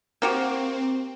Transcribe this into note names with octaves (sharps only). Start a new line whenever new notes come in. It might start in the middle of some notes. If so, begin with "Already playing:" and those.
A#3 C4 F#4 G4